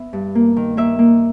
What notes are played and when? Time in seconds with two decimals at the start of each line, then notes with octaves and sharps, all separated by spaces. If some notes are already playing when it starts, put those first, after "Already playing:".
Already playing: B3 E5
0.13 G2
0.35 A#3
0.57 D#3
0.77 A#3 E5
0.99 A#3